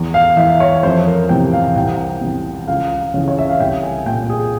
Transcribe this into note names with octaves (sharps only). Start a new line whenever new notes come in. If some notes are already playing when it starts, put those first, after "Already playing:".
Already playing: E2
F5
E3 E5
C#5
F2 C5
A#4
C3 E3 G5
F5
C2 G5
C3 E3
C#2 F5
C#3 E3
C#5
E5
F5
C2 G5
G#5
A#2 G5
G#4